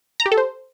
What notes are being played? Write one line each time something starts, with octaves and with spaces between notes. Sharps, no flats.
A#5
G4
A4
C5